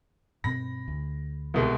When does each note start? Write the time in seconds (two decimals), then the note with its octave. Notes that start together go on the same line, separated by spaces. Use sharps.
0.44 G2 B2 C4 B5 A#6
0.88 D2
1.54 C2 B2 G#3